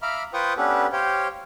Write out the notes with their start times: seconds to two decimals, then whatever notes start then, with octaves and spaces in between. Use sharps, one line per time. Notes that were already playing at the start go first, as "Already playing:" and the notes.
0.02 E5 F5 A#5 B5 D6 F6
0.34 F4 B4 C5 G5 C#6 D#6
0.57 B3 C#4 D4 G4 A4 B4
0.92 G4 C5 C#5 F5 G5